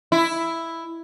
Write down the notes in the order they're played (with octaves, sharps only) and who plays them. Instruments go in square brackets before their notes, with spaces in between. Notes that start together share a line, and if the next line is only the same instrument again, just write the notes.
[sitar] E4